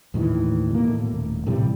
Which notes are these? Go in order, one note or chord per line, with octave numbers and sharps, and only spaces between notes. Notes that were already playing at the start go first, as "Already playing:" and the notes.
D#2 A2 D#3 E3
B2 A#3
A2
D#1
A2 C3 E3 G3